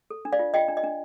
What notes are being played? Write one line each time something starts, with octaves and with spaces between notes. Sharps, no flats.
A4
D4
D5 F5
F4
F4 D#5 G5
D4
D#5
D4